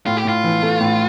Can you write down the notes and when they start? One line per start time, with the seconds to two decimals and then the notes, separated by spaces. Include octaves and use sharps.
0.06 A2 F4
0.17 G4
0.25 A2 F4
0.44 E3
0.63 A3
0.80 A2